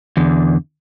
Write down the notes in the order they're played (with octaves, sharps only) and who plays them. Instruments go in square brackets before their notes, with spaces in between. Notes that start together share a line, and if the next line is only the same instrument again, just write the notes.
[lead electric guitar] E2 D3